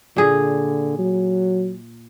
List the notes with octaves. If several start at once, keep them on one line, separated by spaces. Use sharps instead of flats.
A#2 D3 G#4
F#3